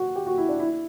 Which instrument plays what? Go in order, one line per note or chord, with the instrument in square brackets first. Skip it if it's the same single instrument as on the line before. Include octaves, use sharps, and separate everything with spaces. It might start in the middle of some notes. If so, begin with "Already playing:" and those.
Already playing: [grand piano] F#4
G4
F#4
E4
D4
E4